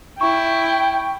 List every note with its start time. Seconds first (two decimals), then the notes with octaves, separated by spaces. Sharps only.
0.21 E4 G5 C#6